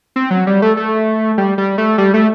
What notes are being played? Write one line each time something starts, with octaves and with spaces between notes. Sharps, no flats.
C4
F#3
G3
A3
A3
G3
G3
A3
G3
A3